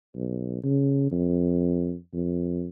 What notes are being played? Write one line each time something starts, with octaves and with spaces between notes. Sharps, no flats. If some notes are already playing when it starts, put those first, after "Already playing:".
B1
C#3
F2
F2